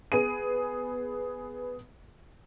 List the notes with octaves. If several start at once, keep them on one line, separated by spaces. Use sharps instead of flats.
B3 G#4 D#7